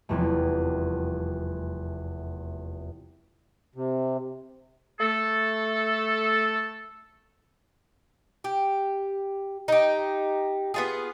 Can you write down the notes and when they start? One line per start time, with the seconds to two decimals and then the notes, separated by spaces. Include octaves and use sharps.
0.09 F1 E2 G3 A3
3.76 C3
5.00 A3 A4
8.44 G4
9.68 D#4 G4
10.74 B3 F4 G#4